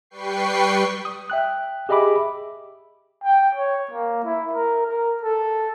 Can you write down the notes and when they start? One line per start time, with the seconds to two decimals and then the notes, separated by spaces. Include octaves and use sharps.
0.10 G3 B4 G5 C#6 C7
1.05 D#6
1.30 E5 G5 F#6
1.89 G4 G#4 D#5 E5 B5 D6
3.24 G5
3.55 C#5
3.91 A#3
4.25 E4
4.53 A#4
4.87 A#4
5.23 A4